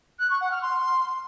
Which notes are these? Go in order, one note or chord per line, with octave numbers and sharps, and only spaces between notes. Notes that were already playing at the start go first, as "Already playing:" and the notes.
F#6
C#6
F#5
F6
C6